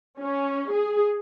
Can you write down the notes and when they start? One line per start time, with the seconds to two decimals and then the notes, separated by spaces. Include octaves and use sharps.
0.19 C#4
0.72 G#4